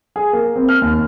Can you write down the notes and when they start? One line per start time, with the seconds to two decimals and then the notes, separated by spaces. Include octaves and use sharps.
0.16 G#4
0.33 A#3
0.56 C4
0.69 F6
0.82 D#2